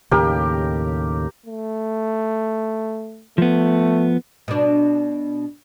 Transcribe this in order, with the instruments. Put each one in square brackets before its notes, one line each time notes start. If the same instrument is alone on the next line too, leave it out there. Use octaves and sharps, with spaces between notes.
[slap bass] D#2 A2 C#3 [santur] G4 A#4
[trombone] A3
[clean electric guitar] F3 B3 [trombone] A3
[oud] B2 D4